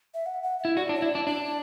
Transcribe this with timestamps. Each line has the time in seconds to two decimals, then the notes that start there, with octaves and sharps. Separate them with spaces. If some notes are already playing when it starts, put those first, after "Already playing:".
0.14 E5
0.26 F#5
0.43 F#5
0.59 E5
0.65 E4
0.77 F#4 D5
0.89 D4
0.95 C#5
1.02 E4 D5
1.15 D4
1.27 D4 D5